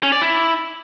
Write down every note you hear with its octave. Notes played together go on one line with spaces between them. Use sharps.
C#4
D5
E4